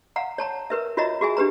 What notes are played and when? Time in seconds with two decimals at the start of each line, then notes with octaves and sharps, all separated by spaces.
0.16 F5 F#5 A#5
0.38 C#5 A5 A#5
0.70 A#4 B4 E5
0.97 F4 F#4 C#5 D#5 E5 A#5
1.21 F#4 G#4 E5 G#5
1.37 D4 G4 B4 A#5